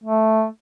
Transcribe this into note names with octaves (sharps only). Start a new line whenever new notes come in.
A3